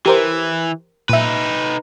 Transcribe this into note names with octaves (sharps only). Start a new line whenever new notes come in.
E3 G4 A#4 C5
A#2 D#4 B4 E5